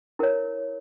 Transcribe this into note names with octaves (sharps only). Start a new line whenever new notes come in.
E4 A#4 C#5